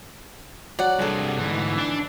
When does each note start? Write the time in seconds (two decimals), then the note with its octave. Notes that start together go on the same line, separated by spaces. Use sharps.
0.79 F#3 D5 F#5
0.99 G2 C3 G#4 A4
1.38 D2 G#2 E3
1.78 D4